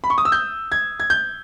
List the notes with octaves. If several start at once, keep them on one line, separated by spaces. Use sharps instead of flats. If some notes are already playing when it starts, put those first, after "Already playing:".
B5
C#6
D#6
E6
G6
G#6
G#6
G6